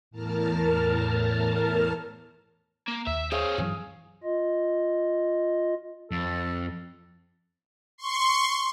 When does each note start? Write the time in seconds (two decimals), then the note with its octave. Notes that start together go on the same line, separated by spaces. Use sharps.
0.11 E2 A2 A#4 A5 F6
2.88 A#3
3.07 D#2 E5
3.32 C4 G#4 C#5 F5
3.58 G2 E3 F#3 G#4
4.23 F4 D#5
6.11 F2 A4
7.98 C6 C#6